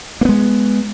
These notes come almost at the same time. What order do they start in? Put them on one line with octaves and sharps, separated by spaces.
A#3 B3 G#3